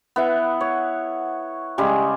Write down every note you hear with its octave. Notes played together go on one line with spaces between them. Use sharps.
B3 E4 F#5
C#5
C#3 G3 G#3 G#4